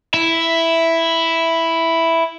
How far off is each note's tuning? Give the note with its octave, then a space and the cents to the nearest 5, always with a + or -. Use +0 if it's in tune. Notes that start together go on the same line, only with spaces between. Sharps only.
E4 +0 E5 +0